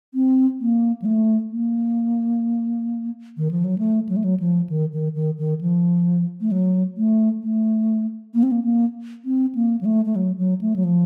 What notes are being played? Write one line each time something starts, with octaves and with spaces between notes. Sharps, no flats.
C4
A#3
F#3
A3
A#3
D#3
F3
F#3
A3
F#3
A3
F#3
F3
D#3
D#3
D#3
D#3
F3
A3
F#3
A3
A3
A#3
C4
A#3
A#3
C4
A#3
F#3
A3
A3
F#3
F#3
A3
F#3
F3